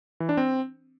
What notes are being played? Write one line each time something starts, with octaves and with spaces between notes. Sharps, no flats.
E3
D4
C4